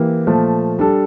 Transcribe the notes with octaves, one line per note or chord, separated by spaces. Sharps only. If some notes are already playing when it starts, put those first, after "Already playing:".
Already playing: E3 A#3 E4 G4 A#4
A#2 F3 A3
G3 D4 A4